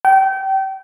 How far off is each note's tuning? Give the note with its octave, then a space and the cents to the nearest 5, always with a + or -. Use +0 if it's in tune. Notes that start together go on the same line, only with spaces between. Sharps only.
G5 -30